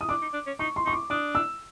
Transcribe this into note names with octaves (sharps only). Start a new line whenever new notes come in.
D#6
D4 D6
D#4
D4
C#4
D#4 C#6
C6
D#4 C#6
D6
D4 D#6
E6